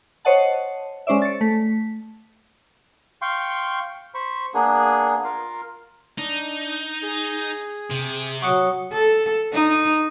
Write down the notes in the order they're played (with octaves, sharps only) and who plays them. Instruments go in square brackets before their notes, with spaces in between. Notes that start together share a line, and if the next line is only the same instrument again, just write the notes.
[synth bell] C5 C#5 D#5 F#5 A5
G#3 C#4 C5 D5 E5
A6 C#7
A3 B6
[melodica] F5 G5 C6 C#6
C5 B5 C#6
A#3 B3 D4 G#4
F4 A#4 F5
[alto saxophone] D4 [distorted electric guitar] D#4
[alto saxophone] G#4
[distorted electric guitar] C3
[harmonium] F#3 [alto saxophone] F#5 [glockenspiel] C#6 D#6 C#7
[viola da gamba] A4
D#4